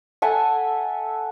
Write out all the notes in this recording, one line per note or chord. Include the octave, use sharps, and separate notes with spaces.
A4 E5 F#5 G#5